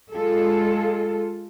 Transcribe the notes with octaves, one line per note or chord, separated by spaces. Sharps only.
G#3 F4 A4